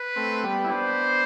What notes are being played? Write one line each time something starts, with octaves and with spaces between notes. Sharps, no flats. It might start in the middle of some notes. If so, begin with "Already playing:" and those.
Already playing: B4
A3 C4
G3 B3
E4
B3 D4 C5